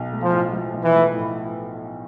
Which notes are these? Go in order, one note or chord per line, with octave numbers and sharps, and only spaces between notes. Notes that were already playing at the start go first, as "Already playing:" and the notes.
Already playing: B1
A3
F3
A2
F3
B1
E3
A3
A2